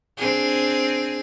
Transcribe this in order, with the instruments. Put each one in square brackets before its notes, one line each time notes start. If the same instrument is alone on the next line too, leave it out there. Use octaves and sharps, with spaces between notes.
[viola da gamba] C4 D4 G#4